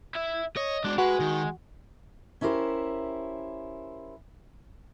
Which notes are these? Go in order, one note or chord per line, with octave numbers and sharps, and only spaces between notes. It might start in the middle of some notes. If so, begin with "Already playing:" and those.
E4 E5
C#5 D#5
G#3 D4 F#4
G#3 F#4 B4
D#3
C#4 E4 G4 A#4 C5